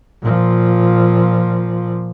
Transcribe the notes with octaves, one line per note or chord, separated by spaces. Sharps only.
A#2 F3